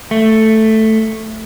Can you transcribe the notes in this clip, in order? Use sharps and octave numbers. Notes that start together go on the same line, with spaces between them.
A3